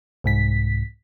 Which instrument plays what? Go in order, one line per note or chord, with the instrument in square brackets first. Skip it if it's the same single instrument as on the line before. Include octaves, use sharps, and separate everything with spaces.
[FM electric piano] C2 G#2 B6